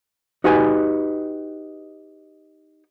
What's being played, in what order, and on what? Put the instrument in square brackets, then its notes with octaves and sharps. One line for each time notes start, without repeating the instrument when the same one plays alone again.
[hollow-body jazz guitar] D#4 F#4 G4 B4 G#5